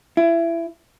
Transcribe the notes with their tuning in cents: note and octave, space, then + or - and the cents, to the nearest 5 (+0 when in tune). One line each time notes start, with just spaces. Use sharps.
E4 +25